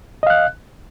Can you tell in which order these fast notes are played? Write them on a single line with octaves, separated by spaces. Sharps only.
D#5 F5 F#6